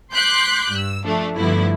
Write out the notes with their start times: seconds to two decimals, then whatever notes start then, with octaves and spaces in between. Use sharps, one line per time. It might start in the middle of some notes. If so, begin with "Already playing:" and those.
0.13 C6 D6 F#6 G6 B6
0.71 G2 E6
1.05 F3 A3 D4
1.36 G2 D3 F3 A3 B3 E4